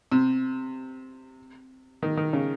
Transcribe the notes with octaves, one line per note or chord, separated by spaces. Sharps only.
C3
D#3
D#3
C#3